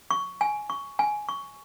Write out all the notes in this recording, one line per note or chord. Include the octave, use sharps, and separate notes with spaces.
C#6
G#5
C#6
G#5
C#6